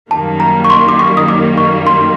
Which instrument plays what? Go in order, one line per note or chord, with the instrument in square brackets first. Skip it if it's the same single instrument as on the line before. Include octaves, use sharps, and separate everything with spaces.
[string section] F#2 D#3 G3 A#3 [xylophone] A5
[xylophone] A#5
C#6
C6
D6
C#6
D#6
D6
C#6
C6